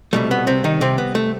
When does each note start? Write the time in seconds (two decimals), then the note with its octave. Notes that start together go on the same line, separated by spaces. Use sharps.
0.13 C2 B2 G3 A3
0.31 B3
0.47 C3 C4
0.64 D#3 D#4
0.81 C3 C4
0.98 B3
1.15 A3